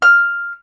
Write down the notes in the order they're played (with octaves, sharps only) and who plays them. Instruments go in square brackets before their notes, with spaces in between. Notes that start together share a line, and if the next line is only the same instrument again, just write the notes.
[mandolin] F6